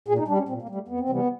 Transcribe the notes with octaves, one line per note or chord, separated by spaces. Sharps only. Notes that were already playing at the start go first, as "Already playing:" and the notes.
A#2 G#4
D#4
G3 D4
C#4
A#2 C4
A#3
G3
A3
F2 B3
C4
C3 E3 G3 B3